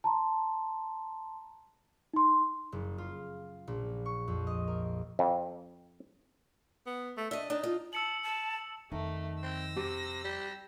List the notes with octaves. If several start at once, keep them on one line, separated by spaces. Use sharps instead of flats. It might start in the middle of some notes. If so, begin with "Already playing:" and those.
A5 A#5 C6
D#4 C6
F#1
F4
A#1
C#6
F2
D#5
A#4
F2
B3
A3
D4 D#5 E5
D4 D#4
F4
A5 E6 C#7 F#7
A5
F2 D#3 A3
C4 E6 A#6
C3 G4
G3